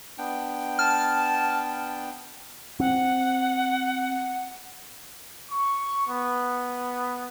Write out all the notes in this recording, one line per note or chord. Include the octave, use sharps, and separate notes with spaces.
B3 D4 G5
A5 F6
C4 F#5
C#6
B3